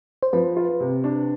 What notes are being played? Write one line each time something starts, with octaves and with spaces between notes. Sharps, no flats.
C5
F3 B4
F4
C3
D4